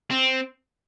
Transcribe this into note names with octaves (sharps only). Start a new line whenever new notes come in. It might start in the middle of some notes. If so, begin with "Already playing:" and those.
C4